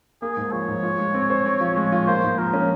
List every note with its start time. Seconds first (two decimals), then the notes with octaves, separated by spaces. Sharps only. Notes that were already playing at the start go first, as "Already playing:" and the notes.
0.22 A#3 G#4
0.37 G#2
0.52 F3 C#5
0.68 G#2
0.83 F4
0.99 G#3
1.14 C4
1.30 C5
1.46 C4
1.61 F3
1.76 G#3
1.92 F4
2.07 A#3 C5
2.23 G#2
2.38 F3 A#4
2.53 C#4